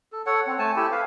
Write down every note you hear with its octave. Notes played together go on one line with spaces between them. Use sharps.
A4
A4 C#5 F#5
C4
A3 G#5 A5
E4 G4 A4
B4 F5